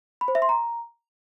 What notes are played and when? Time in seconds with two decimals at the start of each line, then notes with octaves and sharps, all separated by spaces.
0.21 B5
0.28 C5
0.35 E5
0.42 C6
0.49 A#5